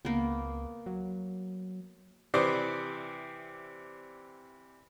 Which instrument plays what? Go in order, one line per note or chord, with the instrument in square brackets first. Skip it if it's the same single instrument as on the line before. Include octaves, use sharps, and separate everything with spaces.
[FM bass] C#2 [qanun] A#3 B3
[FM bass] F#3
[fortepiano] C3 E3 C5 D5 D#6